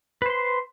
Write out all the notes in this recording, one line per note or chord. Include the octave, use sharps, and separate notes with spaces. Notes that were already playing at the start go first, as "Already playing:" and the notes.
B4 C5 C6